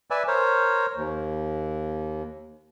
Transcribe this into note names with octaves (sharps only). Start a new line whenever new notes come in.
B4 D5 E5 G#5 E6
A#4 C5 C#5
D#2